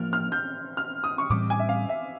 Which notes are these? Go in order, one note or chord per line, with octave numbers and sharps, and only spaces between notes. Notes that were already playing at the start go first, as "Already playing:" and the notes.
Already playing: A2 F3 A#3 F6
F6
G6
F6
D#6
C#6
A2 E3 G3 C4 D6
G#5
E5
F5
E5